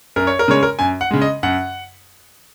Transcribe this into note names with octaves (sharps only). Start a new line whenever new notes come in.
F#2 A#4
C#5
A#4
C#3 G#3 C#5
A#4
F#2 G#5
F#5
C#3 G#3
D#5
F#2 F#5